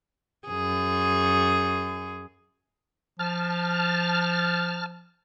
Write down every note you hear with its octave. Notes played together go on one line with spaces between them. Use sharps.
F#2 G#4
F3 A5 F6